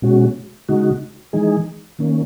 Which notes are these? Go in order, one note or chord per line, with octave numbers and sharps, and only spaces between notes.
B2 G#3 C#4 F#4
C#3 G#3 D#4 F#4
E3 G#3 D#4 G#4
D#3 A#3 C#4